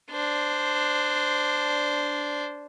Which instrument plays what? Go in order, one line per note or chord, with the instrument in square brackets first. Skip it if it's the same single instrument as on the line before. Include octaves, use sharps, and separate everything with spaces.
[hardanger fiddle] D4 C5